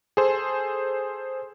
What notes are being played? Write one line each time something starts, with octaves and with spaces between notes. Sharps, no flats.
G#4 A4 C5